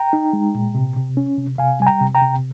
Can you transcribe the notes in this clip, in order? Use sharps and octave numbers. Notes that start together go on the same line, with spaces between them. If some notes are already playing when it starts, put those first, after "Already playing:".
Already playing: G5 A#5
D#4
G#3
A#2
C3
C3
C#4
C3
C3 F5 G#5
G3 G#5
G5 A#5
C3
G5 A#5
C3